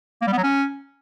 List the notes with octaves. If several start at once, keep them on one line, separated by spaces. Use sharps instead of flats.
A#3
G3
B3
F#3
C#4